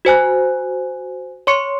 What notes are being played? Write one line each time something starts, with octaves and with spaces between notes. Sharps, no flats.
F#4 C5 G#5 F#6
C#5 C6 C#6 C#7